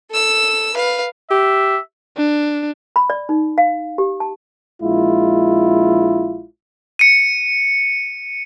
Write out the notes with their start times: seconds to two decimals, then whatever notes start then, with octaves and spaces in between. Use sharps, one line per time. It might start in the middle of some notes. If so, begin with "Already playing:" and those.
0.11 A4 E6
0.74 B4 F5
1.31 G4 E5
2.17 D4
2.96 B5
3.10 D5
3.29 D#4
3.58 F5
3.98 G4
4.20 A5
4.82 A#1 G#3 E4 F4
6.99 C#7 D#7